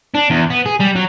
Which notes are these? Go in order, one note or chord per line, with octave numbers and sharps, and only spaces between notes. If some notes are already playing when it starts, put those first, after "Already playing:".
D4
E2
B3
G#4
G3
F#3